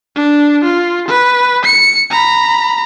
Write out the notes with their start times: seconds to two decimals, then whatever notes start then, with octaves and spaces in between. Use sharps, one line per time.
0.16 D4
0.64 F4
1.08 B4
1.65 C#7
2.11 A#5 B5